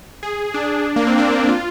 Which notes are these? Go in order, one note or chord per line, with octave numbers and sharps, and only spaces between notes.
G#4
D4
A#3
C4
D4
F4